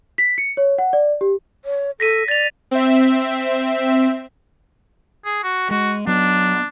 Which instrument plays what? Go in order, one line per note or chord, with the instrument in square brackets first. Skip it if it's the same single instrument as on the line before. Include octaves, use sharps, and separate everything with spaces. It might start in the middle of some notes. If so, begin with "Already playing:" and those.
[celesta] B6
C#7
C#5
F#5
D5
G4
[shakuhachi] C#5
[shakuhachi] A4 [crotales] A#6 B6 D#7
[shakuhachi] D5 [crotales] A6 F7
[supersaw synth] C4 E5
[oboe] G#4
F#4
[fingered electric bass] G#3 [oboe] F#4
[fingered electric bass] F#3 B3 [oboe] D4